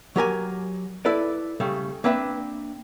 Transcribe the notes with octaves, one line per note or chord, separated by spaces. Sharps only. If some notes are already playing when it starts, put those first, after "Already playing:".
F#3 G4 A#4 G#5
E4 A4 B4 D5
C#3 G3 A3
A#3 C4 D4 B4 E5